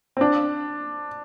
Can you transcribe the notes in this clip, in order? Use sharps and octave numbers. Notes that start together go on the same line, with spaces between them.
C4
D4